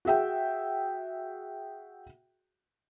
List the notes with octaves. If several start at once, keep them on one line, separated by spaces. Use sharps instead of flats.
F#4 G#4 E5 G5